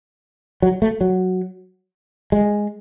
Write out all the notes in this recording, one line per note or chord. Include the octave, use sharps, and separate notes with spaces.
F#3
A3
F#3
G#3